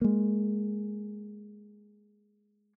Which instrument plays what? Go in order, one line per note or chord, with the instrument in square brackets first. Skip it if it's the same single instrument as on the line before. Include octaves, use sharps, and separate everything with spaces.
[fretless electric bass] G#3 A#3